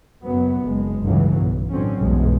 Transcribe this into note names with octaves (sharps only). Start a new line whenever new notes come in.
F#1 F#2 F#3 B3
F#1 G#3
G1 C#2 A2 C#3 E3 F#3
B1
A2 D3 F#3 C4 C#4
B1 E2 G2 E3 G#3